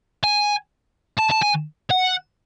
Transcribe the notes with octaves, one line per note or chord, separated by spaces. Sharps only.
G#5
A5
A5
G#5
F#5